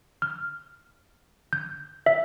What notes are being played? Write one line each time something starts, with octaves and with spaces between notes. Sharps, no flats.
F6
G6
E5